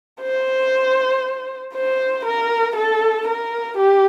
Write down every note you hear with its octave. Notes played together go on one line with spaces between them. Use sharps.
C5
C5
A#4
A4
A#4
G4